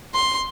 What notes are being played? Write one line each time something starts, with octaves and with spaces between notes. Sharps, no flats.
C6